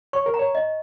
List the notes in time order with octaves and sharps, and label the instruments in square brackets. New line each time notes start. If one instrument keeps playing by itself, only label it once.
[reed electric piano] C#5 [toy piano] C#6
[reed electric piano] A#4
[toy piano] A#5
[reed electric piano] C#5
[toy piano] D#5